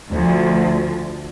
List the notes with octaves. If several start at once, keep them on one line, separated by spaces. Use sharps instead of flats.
D2 F3